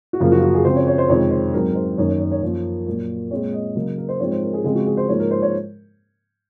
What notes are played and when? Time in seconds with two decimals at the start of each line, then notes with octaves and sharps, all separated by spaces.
0.13 F#4
0.20 F#2 C#3 F3 A#3 F4
0.32 F#4
0.43 F#4
0.54 G#4
0.65 C#3 F3 C4 C5
0.76 C#5
0.87 C#5
0.98 C5
1.09 F2 C3 D#3 G#3 C4 C#5
1.31 C5
1.54 G#2 F#3 C4 A#4
1.70 A#4
1.75 C5
1.98 F#2 D#3 A#3 C#5
2.09 C#5
2.20 C#5
2.31 C#5
2.42 F#2 F3 A#3 C#5
2.87 A#2 F#3 A#3
3.31 A#2 G#3 C4 C#5
3.53 D#5
3.75 C#3 F#3 A#3
3.98 A#4
4.09 C5
4.20 G#2 F3 G#3 C4 C#5
4.31 C5
4.42 A#4
4.53 G#4
4.64 C#3 F3 G#3 C4 G#4
4.75 F#4
4.86 G#4
4.97 C5
5.08 G#2 F3 A#3 C#5
5.20 A#4
5.31 C5
5.42 C#5